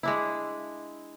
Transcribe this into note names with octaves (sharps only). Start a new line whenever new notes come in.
G#3 D4 E4